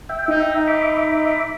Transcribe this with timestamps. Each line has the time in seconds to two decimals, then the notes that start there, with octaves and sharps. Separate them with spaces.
0.09 E5 G5
0.28 D#4
0.68 E5 B5 D6